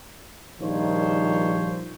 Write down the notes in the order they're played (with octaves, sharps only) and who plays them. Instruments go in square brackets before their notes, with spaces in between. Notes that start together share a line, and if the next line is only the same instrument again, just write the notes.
[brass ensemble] A#1 D#3 F3 G3 C5 C#5